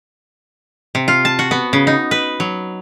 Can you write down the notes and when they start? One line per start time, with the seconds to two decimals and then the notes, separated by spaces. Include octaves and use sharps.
0.95 C3
1.08 F4
1.25 A5
1.39 F#4
1.51 B3
1.73 C#3
1.87 D#4
2.11 B4
2.40 F#3